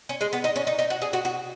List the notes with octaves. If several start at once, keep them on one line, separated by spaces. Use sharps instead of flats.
C#4
G#3
B3
D#4
C#4
D#4
D#4
F#4
G#4
F#4
F#4